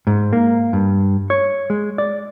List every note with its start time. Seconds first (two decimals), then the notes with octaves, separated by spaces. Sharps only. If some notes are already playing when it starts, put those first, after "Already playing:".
0.07 G#2
0.33 A#3
0.73 G2
1.30 C#5
1.70 G#3
1.98 D5